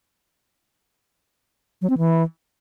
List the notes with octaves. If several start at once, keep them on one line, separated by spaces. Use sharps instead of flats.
F#3
C4
E3